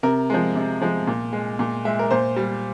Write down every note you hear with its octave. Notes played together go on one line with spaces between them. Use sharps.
C3 A#4
F3 G#3
C3
F3 G#3
A#2
G#3
A#2
G#3 E5
A#4
A#2 C5
G3